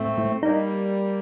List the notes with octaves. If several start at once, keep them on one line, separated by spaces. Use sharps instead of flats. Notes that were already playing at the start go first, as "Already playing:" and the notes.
Already playing: A2 A3 C4
A2
G3 A#3 D#4